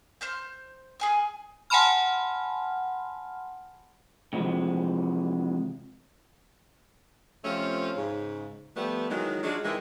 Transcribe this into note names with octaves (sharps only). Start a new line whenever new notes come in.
C5 F6 G6
G#4 G#5 F6
F#5 G#5 A5 B5 C6 F6
C3 E3 F3 G#3
C3 F3 A3 C#4 F4
G#2 C#3
F3 G3 A3 B3
D#3 E3 F#3 G#3
F#3 G#3 D4 F4 F#4
C3 D#3 E3 G#3